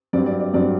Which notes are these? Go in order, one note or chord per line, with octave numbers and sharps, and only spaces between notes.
G2 F#3 C4 D5
D5
D5
G2 F#3 C4 D5